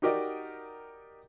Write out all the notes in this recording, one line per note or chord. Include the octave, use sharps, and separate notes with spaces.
D#4 F#4 G4 A#4 D5 D#5